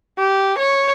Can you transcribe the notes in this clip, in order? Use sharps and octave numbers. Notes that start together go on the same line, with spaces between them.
G4
C#5